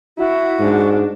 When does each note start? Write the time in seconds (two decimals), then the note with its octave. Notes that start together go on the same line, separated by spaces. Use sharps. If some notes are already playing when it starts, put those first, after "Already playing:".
0.18 E4 F#4
0.59 G#2 D4